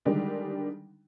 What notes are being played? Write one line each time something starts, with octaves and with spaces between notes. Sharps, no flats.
D3 D#3 G3 G#3 D4 D#4